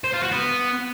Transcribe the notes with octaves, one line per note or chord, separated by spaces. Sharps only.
C5
F4
F#4
B3